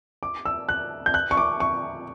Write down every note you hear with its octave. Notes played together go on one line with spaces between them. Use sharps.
D6
E6
F#6
G6
F#6
C#6
D6
C#6